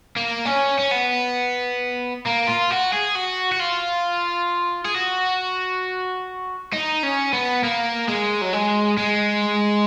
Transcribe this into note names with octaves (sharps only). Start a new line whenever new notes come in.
A#3
C#4
C#4
B3
A#3
F4
F#4
G#4
F#4
F#4
F4
G#4
F#4
D#4
C#4
B3
A#3
G#3
F#3
G#3
G#3